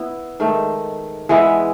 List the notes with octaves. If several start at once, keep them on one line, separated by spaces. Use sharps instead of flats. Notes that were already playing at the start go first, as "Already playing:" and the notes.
Already playing: B3 E4
G#2 D#3 A3
E3 G#3 B3 E4